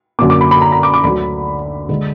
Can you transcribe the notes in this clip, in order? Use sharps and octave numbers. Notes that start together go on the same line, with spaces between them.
F#2 D3 F#3 A#3 D6
D6
B5
B5
A#5
A#5
D6
D6
D2 D3 F#3 B5
D3 G#3